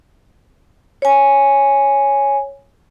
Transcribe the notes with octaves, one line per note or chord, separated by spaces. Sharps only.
C#5 G#5